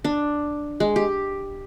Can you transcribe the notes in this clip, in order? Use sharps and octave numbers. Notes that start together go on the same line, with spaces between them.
D4
G#3
G4